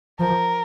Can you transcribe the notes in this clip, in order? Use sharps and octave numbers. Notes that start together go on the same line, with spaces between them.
F3 A#4